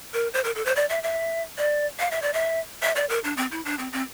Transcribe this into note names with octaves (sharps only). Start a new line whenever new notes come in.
A#4
C5
A#4
A4
C5
D5
E5
E5
D5
F5
E5
D5
E5
E5
D5
A#4
D4
C4
E4
D4
C4
C4